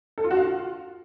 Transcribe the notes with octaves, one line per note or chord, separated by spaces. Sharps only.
A4
F4
F#4
F5
F4